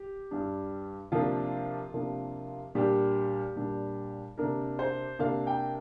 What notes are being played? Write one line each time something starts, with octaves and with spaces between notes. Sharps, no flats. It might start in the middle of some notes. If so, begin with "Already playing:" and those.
Already playing: G4
G2 G3 D4
C3 F3 A#3 D4 F4
C3 F3 A#3 D4
A#2 G3 D4 G4
A#2 G3 D4
C3 A#3 D4 A#4
C5
C3 A#3 D4 F5
G5